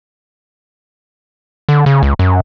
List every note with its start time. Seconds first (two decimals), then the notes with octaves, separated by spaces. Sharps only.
1.69 D3
1.86 C#3
2.03 C#2
2.19 F#2